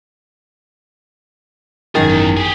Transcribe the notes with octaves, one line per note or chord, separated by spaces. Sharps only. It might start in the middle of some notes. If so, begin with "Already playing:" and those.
G#1 F#2 D#3 G#4 A6
E2
G4 G#4